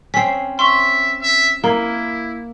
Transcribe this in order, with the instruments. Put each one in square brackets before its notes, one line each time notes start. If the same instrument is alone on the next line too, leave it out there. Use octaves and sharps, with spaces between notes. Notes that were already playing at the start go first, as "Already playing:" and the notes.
[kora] C4 C#4 [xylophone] B6 C7
[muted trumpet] E5 [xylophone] C6 C#6
[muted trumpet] E5
[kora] A#3 [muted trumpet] E4 [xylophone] A#4